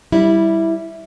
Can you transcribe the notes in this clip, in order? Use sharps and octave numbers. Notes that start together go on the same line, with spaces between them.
G3 E4